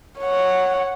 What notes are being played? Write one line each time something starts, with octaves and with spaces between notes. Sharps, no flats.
C#5 F#5